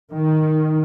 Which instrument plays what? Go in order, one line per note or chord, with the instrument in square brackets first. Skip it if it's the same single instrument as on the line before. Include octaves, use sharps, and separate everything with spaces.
[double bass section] D#3